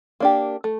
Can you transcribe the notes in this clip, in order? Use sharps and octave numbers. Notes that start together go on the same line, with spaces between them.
A#3 D4 G4
A3